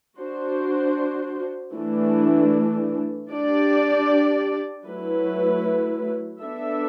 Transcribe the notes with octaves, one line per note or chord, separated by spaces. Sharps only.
D4 F#4 C5
E3 A3 D4
D4 G4 D5
F#3 A3 E4 B4
B3 D4 A4 E5